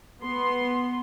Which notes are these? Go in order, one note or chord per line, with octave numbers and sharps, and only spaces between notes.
B3 C6